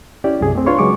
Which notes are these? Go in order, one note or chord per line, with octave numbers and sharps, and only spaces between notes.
C#4 E4 G4 D5
C2 F#2 C3 G#4
A3 C4
D4 F4 B4 C#5 C6 C#6
C#3 F#3 G#3 G#4 C#6 D6